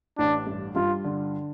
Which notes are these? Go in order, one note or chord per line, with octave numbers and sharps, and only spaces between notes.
A1 D4
G2
G2 F4
D3